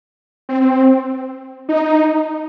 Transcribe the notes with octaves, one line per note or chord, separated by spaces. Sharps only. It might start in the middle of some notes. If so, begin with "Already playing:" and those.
C4
D#4